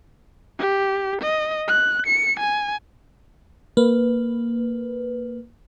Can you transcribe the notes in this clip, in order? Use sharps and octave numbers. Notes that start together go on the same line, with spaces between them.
G4
D#5
F#6
C#7
G#5
A#3 B4